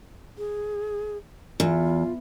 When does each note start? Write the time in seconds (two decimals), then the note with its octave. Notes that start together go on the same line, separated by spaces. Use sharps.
0.38 G#4
1.60 E2 F4